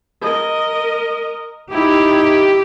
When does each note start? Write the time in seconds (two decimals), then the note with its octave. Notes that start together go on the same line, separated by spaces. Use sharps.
0.22 A#4 D#5
1.72 D#4 E4 G4